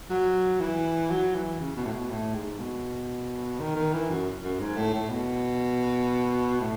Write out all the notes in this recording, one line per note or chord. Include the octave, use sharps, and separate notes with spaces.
F#3
E3
F#3
E3
C#3
B2
A2
B2
A2
G#2
B2
D#3
D#3
E3
F#2
F#2
G#2
A2
A2
B2
A2